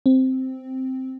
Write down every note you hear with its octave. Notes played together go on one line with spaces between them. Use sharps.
C4